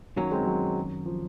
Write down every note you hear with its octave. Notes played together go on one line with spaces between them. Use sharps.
F#2 D#3 F#3 A#3 C#4
G#3 C4
F#3
F3